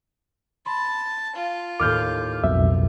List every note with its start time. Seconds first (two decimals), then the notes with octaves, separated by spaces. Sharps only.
0.66 A5 B5 C6
1.35 F4
1.80 D#2 A2 D6 F6 G6
2.44 B1 F2 B2 E5